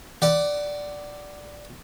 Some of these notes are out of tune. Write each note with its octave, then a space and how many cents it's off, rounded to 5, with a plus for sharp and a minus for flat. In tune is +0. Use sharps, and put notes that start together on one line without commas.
D5 +0 F#5 +25